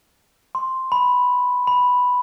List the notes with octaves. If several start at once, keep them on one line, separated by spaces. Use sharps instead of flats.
C6
B5
B5